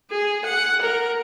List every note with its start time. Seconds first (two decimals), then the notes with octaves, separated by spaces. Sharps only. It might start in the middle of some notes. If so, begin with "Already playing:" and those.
0.11 G#4
0.45 F#5
0.82 A#4